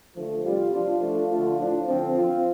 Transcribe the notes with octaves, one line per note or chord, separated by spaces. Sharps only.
D3 F3 A3
C3 G3 F4
F3 D4 F4
F3 A3 D4 F4
D3 A3 F4
A2 F3 D4 F4
D3 F3 C4
F3 C4 F4